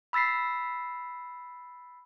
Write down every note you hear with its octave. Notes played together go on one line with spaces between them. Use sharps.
B5 E6 A6 B6 C7